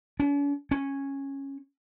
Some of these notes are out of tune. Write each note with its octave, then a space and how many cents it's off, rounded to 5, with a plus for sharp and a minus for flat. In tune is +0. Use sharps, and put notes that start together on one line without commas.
C#4 +45
C#4 -10